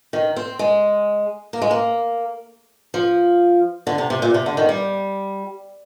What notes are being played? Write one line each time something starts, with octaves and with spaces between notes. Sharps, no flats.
D#3
C4
G#3
A#3
G#3
A#3
F3
D3
C3
C3
A#2
C3
D3
D#3
G3